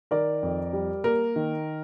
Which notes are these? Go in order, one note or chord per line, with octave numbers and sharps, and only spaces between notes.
D#3 A#4 D5
F2
G3
A#3 A#4
D#3